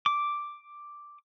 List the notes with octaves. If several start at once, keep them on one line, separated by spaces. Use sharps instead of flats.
D6